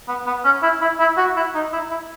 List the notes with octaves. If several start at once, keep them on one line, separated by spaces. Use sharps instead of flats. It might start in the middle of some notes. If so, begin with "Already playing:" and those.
B3
B3
C#4
E4
E4
E4
F#4
E4
D#4
E4
E4